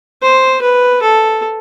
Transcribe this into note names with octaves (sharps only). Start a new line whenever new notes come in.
C5
B4
A4